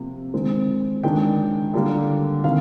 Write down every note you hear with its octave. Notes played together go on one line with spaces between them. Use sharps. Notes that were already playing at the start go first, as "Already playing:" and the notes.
Already playing: C3 F3 A#3
D#3 G#3 C4
D#3 G#3 D4 G5
D3 G3 A#3
C3 D#3 F5